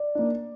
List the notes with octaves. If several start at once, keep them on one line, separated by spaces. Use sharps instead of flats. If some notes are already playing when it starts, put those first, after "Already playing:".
Already playing: D5
A#3 D4